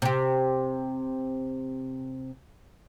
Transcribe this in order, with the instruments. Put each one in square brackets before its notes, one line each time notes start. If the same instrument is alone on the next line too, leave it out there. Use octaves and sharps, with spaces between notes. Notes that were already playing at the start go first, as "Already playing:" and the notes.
[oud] C3 G4